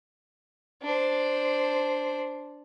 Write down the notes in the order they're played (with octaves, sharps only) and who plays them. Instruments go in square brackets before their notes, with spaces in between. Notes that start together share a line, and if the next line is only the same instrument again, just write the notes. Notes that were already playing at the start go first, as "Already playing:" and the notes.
[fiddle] D4 C5